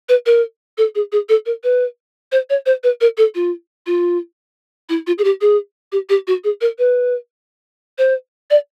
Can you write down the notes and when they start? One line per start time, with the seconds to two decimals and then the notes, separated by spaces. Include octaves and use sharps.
0.09 B4
0.26 A#4
0.78 A4
0.95 G#4
1.12 G#4
1.29 A4
1.46 A#4
1.64 B4
2.32 C5
2.50 C#5
2.66 C5
2.83 B4
3.01 A#4
3.18 A4
3.35 F4
3.86 F4
4.89 E4
5.07 F4
5.18 G#4
5.24 G4
5.41 G#4
5.92 G4
6.09 G4
6.27 F#4
6.44 G#4
6.61 A#4
6.78 B4
7.98 C5
8.50 D5